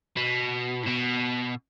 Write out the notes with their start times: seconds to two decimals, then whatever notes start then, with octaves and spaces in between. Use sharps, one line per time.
0.17 B2
0.83 A2
0.87 B2